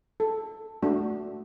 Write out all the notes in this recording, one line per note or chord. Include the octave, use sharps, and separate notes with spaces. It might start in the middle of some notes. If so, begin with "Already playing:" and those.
A4
A3 D4 F#4